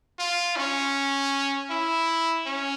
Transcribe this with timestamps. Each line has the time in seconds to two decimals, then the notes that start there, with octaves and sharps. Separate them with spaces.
0.19 F4
0.56 C#4
1.70 E4
2.46 C#4